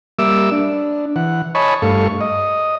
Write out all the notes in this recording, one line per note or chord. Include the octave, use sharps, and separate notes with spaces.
G3 A#3 E5 D6 E6
D4
E3 F#5
C#5 D#5 G#5 A5 B5 C#6
G2 A3 A4 F5 C#6
D#5